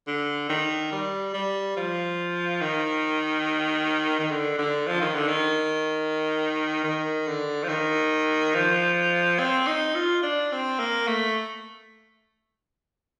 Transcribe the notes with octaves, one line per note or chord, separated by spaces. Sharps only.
D3
D#3
G3
G3
F3
D#3
D#3
D3
D3
F3
D#3
D3
D#3
D#3
D3
F3
D#3
F3
C4
D#4
F4
D4
C4
A#3
A3